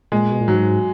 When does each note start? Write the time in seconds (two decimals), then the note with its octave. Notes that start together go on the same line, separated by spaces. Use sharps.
0.12 A#2 G#3
0.31 B2
0.41 A#2
0.48 G#2 F#3